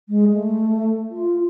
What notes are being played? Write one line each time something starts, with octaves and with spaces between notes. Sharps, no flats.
G#3
A3
F4